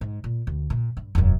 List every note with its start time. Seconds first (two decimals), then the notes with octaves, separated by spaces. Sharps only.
0.01 G#2
0.24 A#2
0.47 D2
0.70 A#2
0.97 G2
1.15 E1 F#2